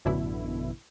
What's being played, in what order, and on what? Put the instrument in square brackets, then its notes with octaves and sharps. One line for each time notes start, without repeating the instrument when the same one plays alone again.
[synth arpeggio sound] A1 F#2 B2 D3 E4